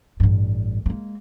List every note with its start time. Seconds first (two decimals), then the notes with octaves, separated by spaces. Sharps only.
0.20 A1 G2
0.86 G#3 A#3